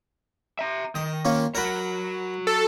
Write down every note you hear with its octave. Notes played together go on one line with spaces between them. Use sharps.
E5 A#5
D#3 D#5
A#3 C#4 F4
F#4 A#4 C#5 F#5 B5
A4